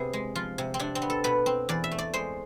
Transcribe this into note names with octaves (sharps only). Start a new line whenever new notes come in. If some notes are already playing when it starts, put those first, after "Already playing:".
Already playing: C3 B3 G#4
G#3
F3 F4
C3
C4
C3 D4
C4
B3
A4
B2 B4
C4
E2 D5
E5
A3
D5
G#3 C5